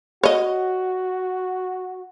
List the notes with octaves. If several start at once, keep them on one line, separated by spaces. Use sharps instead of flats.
F#4 C#5 D#5